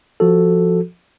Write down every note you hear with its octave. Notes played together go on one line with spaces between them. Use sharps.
F3 F#4 A4